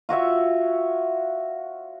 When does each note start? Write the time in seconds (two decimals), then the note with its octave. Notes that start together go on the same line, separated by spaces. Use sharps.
0.09 F4 F#4 C#5 E5